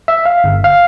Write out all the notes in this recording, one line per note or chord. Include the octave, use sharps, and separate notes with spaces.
E5
F5
G1
F5